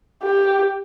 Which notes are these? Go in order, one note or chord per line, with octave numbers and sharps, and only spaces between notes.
G4